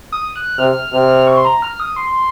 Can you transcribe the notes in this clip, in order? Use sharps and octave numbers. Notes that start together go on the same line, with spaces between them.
D#6
F#6
C3 F6
C3 F6
C#6
C6
A#5
F6
D#6
C6